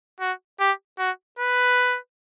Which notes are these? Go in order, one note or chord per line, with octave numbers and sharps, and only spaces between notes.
F#4
G4
F#4
B4